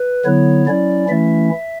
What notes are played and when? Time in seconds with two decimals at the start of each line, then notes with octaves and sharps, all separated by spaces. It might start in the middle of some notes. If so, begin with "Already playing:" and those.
Already playing: B4
0.25 D3 F#3 B3 E4 C#5
0.67 F#3 C#4 E4 D5
1.09 E3 A3 C#4 E4 E5